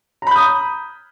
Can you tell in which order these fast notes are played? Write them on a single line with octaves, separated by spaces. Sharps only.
A#5 B5 G6 D#6